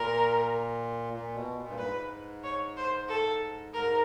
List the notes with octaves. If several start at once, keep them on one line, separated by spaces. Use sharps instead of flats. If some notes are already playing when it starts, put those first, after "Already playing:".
Already playing: A#2 A#4
A#2
B2
A#2
G2
G#2 B4
C#5
C5
A4
G#2 A#4